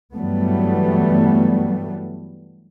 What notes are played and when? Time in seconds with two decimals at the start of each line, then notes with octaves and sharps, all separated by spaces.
0.13 G2 E3 F#3 G3 A3 B3